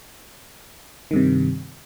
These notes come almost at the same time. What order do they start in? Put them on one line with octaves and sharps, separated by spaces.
D#3 G2 C3